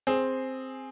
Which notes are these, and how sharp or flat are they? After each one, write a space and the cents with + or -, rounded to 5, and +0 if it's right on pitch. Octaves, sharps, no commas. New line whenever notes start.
C4 +0 G#4 +0